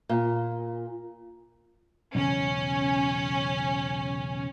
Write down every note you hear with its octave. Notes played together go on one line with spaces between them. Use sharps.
A#2
B1 E2 C#3 C#4